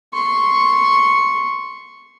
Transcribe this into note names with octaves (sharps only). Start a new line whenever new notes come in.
C6 C#6